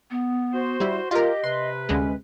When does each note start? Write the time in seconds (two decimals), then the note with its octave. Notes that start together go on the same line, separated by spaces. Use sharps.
0.11 B3
0.53 F#4 C5
0.80 G3 E4
1.11 F4 G4 A#4 D#5
1.44 C3 B4 C6
1.89 D2 G#3 C#4